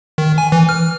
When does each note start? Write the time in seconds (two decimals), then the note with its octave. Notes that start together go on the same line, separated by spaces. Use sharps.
0.18 D#3
0.38 G#5
0.52 E3
0.69 F6